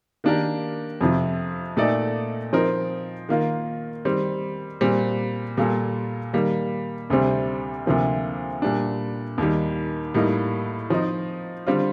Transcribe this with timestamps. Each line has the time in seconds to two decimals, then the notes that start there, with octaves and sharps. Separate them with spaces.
0.24 D#3 A#3 D4 G4 A#4
1.01 F2 C3 F3
1.77 A#2 A3 D#4 A4 D5
2.53 F3 C4 D#4 A#4
3.29 D#3 A#3 F4
4.05 D#3 G3 C4
4.81 A#2 G3 C4
5.57 A#2 G3 A#3 F4 A4
6.33 D#3 G3 A#3
7.10 D2 C3 G3 C4
7.86 D2 C3 F3 A#3
8.62 A#2 G3 D4
9.38 D#2 D#3 G3
10.14 A2 G3 A#3 D#4
10.90 F3 C4 D#4
11.67 D3 G3 C4 F4